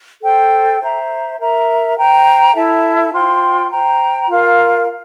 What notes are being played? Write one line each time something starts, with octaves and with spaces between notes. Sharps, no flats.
A4 C5 G5
C5 E5 A#5
A#4 E5 A#5
C5 G5 A#5
E4 A4 E5 A5
F4 C5 G5 C6
C5 G5 A#5
F4 A#4 F5